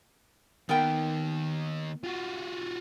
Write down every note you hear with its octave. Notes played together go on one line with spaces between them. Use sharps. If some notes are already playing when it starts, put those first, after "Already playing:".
D#3 A#3 B3 A#4 G5
F4 F#4